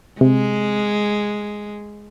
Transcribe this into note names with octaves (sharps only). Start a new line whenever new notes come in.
C3 G#3